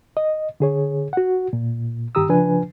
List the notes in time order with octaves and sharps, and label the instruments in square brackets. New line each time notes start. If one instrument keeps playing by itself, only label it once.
[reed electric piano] D#5
D3 G#4 C#5
F#4 F#5
A#2
G2 D#3 G4 A#5 D#6 E6
C#3 F3 D4 B4 G#5